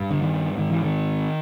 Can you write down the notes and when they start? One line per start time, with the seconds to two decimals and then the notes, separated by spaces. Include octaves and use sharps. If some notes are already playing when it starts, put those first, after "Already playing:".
Already playing: G2
0.11 D3
0.22 D#3
0.57 G#2 D#3
0.70 E3
0.83 D#3